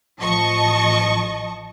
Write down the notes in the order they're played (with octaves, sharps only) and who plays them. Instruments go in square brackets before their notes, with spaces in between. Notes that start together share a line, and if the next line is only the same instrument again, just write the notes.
[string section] A1 F3 D#5 A5 C#6